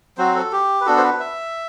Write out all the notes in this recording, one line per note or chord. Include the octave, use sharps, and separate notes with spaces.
F#3 C4 F#4 C5
A4
G4
B4
B3 D4 F#4 A4
C5
B4
E5